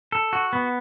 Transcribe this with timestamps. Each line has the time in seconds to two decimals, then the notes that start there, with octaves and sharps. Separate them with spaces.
0.12 A4
0.33 F#4
0.53 B3